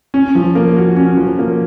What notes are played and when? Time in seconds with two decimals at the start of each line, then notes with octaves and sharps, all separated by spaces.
0.14 C#4
0.35 F3
0.55 A#3
0.77 F#4
0.97 C#4
1.17 F3
1.39 A#3